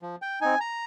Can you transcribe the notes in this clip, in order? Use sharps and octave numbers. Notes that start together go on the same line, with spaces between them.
F3
G5
C4 D#4 G#5
A#5